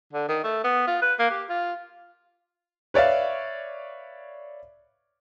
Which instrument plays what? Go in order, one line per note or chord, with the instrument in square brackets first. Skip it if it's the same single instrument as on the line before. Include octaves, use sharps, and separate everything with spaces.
[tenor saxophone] D3
D#3
A3
B3
F4
B4
A#3
G4
F4
[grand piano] B4 C#5 D5 E5 F5